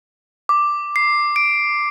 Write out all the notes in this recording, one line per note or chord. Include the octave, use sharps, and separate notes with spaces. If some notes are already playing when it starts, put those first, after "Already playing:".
D6
C7
D7